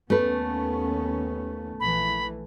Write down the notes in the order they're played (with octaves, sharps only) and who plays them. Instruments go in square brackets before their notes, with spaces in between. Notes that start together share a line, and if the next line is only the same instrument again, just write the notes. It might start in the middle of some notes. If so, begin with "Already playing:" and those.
[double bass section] D#2 B3 C#4 [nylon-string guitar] A3 B4
[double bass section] A#1 E3 [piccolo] B5